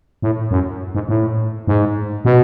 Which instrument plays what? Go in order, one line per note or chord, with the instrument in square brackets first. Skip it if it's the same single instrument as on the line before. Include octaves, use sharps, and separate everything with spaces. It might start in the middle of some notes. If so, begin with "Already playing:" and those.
[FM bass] A2
F#2
G#2
A2
G#2
B2